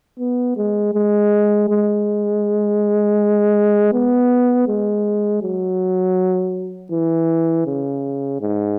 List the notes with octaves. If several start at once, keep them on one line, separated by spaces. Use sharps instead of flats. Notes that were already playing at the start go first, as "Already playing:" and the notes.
B3
G#3
G#3
G#3
B3
G#3
F#3
E3
C#3
G#2